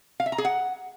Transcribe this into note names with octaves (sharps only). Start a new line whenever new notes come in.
F5
E5
A#5
G#4
F#5